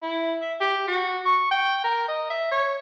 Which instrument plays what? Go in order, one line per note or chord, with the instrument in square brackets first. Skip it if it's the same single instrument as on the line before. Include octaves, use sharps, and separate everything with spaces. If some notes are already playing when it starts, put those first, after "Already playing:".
[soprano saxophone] E4
E5
G4
F#4
C#6
G5
A#4
D#5
E5
C#5